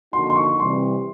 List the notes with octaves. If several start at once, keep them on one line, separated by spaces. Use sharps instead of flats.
D3 F3 A#3 D#4 F#4 C6
C6
C#6
C3 E3 G3 C4 C6